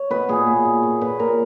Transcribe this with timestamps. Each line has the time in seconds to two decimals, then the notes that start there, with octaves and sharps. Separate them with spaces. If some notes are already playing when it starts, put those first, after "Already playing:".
Already playing: C#5
0.10 B2 B4
0.29 A#2 G#4
0.47 A#2
0.65 A#2
0.83 A#2
1.01 A#2 B4
1.19 A#2 A#4